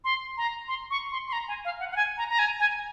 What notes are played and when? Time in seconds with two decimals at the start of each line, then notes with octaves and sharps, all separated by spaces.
0.04 C6
0.37 A#5
0.68 C6
0.91 C#6
1.12 C6
1.28 C6
1.33 A#5
1.48 G#5
1.65 F5
1.80 F#5
1.91 F#5
1.96 G#5
2.18 A#5
2.30 A#5
2.39 G#5
2.59 G#5